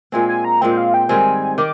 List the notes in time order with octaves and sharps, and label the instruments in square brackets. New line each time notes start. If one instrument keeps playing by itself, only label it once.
[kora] A#2 G#3 C4 [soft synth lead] G#5
[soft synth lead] G#5
A#5
[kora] A#2 G#3 C4 [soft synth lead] G5
[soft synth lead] F5
G5
[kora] G#2 D#3 G3 C4 [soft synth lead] G#5
[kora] D#3 [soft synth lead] D6